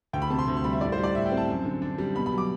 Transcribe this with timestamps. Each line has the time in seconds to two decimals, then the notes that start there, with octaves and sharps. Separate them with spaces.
0.13 D2 G5
0.22 B5
0.30 C3 A5
0.39 C6
0.48 D2
0.57 C6
0.64 G3 B5
0.73 E5
0.81 A2 D5
0.92 C5
0.98 G3
1.03 D5
1.15 A2 E5
1.26 G5
1.32 C4
1.37 A5
1.49 F#2
1.65 D3
1.82 D4
1.98 G3
2.15 B2 B5
2.26 B5
2.32 F#3
2.38 D6